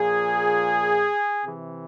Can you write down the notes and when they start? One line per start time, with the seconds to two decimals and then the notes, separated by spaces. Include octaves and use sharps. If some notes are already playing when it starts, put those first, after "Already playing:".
Already playing: A#2 F3 G#4
1.43 C3 E3